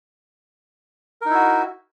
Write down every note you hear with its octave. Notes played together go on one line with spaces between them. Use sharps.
D#4 E4 F#4 A#4